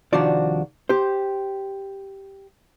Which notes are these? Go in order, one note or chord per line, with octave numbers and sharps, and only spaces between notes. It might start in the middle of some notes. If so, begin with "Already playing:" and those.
C2 D#3 F3 D4 F#4 D5
G4 C5